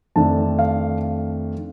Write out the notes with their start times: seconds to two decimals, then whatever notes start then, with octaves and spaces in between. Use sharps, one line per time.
0.16 F2 D#3 A3 D4 A5
0.59 F5